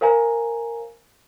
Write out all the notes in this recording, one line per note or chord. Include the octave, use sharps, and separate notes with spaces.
A#4 C5 F5 G#5 A#5